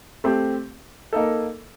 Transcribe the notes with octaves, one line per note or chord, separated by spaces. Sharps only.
A3 C4 G4
A#3 D#4 A4